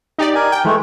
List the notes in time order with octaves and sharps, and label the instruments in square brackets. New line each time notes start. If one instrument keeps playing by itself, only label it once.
[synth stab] D#4 G4 D5
[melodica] A#4 G#5
[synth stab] G5
[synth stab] E3 [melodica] G#3 A3